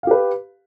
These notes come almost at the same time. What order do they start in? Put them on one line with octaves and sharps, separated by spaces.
F5 G4 B4